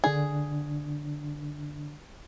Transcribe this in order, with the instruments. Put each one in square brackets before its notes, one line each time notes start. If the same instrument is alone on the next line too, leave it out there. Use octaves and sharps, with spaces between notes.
[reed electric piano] D3 D4 [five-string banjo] G#4